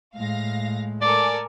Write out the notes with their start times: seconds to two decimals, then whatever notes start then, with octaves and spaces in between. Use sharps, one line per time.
0.16 A2 G#3 F5 A#6
1.02 A4 A#4 D5 G#5 D6